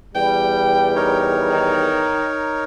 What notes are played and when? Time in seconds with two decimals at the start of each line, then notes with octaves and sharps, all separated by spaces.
0.15 E2 G3 G5
0.95 D#4 A#4 C#5
1.50 D#3